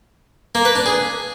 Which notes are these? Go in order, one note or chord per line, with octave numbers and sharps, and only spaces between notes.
A#3
B4
D4
G#4